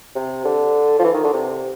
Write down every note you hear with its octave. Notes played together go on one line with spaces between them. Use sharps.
C3
D3
F3
E3
D#3
D3
C3